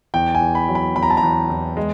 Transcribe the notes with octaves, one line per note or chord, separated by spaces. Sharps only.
E2 G5
G#5
E2
B5
F#3
B5
E2 B5
A#5
A5
A#5
E2
E2
G#3